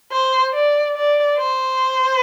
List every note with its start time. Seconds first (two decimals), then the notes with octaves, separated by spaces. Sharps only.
0.12 C5
0.54 D5
0.96 D5
1.38 C5